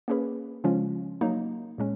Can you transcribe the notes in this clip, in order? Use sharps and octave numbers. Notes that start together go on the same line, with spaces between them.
A#3 C#4 G#4 B4
C#3 F3 G#3 C#4 F4
F#3 A#3 D#4
A#2 G#3 C#4